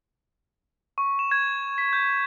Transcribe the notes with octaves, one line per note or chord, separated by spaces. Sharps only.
C#6
E7
G#6
B6
G6